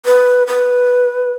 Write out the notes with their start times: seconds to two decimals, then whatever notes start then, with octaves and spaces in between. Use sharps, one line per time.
0.06 B4
0.47 B4